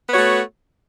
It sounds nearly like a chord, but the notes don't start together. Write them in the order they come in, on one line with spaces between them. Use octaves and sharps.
B3 C#5 F#4 A3